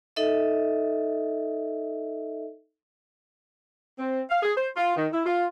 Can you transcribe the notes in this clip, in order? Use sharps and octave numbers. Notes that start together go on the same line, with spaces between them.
D#4 A4 D#5 E5
C4
F5
G#4
C5
F4
D#3
E4
F4